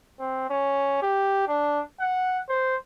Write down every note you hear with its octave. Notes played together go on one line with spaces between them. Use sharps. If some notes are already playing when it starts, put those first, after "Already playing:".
C4
C#4
G4
D4
F#5
C5